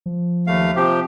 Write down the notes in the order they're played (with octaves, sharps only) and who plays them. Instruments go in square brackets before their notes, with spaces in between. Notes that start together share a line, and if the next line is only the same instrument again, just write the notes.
[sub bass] F3
[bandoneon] D#2 A3 F5
C3 F3 G4